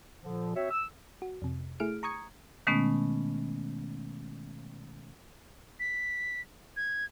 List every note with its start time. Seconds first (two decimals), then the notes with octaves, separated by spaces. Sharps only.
0.22 A#2 D3 F3
0.56 C4 F#4 C#5 E5
0.71 E6
1.22 F#4
1.42 F2 C3
1.80 A3 E4 G#4 F6 D7
2.03 A#5 C#6 D#6 G#6 C#7
2.67 B2 D#3 G#3 A3 B3 C#4
5.80 B6
6.77 G#6